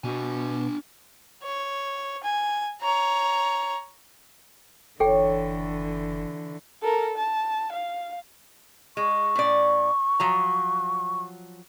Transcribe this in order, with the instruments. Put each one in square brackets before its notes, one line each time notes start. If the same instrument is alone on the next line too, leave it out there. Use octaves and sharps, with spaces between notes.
[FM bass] B2 [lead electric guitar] D4 G#5
[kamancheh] C#5
G#5
C#5 A#5
[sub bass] F#1 [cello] D3 E3 [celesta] A4 G5 [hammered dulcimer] C#5
[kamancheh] A4 A#4
A5
F5
[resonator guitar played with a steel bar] G#3 [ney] C#6
[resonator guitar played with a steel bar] A2 C#4 D5
F3 F#3 A#5